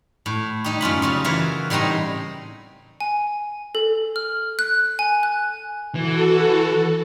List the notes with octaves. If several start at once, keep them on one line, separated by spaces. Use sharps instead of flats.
A2
G3 D#4 G4
F#2 C#4 F4 B5
C#3 G3 F4
E3 F4 F#4 A#4 C#5 E5
A2 G3 C4 D#4 A#5
G#5
A4
F6
F#6
G#5
F#6
E3 F#4 A4